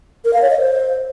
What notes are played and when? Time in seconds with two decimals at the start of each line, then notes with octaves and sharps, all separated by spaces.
0.25 A#4
0.33 F5
0.42 C#5
0.51 D#5
0.59 C5